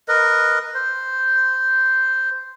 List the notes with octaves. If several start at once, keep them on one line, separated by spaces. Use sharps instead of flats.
A#4 B4 D#5
C5